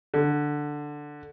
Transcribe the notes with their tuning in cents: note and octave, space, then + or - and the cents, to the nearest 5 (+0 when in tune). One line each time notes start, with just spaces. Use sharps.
D3 +5